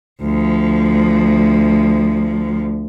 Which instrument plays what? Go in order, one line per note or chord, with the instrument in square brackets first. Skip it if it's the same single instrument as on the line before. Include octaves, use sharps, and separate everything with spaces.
[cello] D2 F3